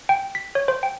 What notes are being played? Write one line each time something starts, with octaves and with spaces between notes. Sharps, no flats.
G5
B6
C#5
C5
G5